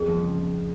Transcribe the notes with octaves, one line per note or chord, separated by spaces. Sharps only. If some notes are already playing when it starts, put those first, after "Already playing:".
Already playing: F2 G#4
F3
C#3
F3